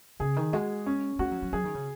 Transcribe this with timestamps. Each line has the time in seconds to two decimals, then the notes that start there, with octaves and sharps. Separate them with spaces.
0.20 C#3 G#4
0.36 D#3
0.53 G#3 F#4
0.86 C#4
1.19 G#3 F#4
1.31 F#3
1.42 F#3
1.53 F#3 G#4
1.64 D#3
1.75 C#3